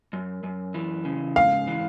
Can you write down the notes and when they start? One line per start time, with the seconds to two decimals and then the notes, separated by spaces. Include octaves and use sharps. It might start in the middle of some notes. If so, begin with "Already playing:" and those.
0.13 F#2
0.43 F#2
0.74 E3
1.05 C#3
1.36 G#2 F5
1.67 E3